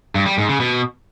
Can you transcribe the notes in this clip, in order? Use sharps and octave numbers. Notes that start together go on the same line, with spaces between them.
G2
G3
G#2
C#3
B2